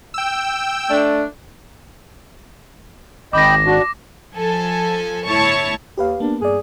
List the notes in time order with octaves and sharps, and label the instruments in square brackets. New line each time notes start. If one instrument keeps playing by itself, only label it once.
[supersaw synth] G5 E6
[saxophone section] A3 D4
[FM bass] G#1 [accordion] D#5 G5 B5 [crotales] D6 A#6
[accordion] D4 F#4
[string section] F3 A4 G#5
G1 A2 E4 C#5 A5 C#6
[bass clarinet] D#2 [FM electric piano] G4 B4 F5
[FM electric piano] A#3 B3 [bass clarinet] D4
[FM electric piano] G2 D5 [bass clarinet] G#4